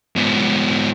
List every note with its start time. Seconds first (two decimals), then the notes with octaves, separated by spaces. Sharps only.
0.16 G#2 B3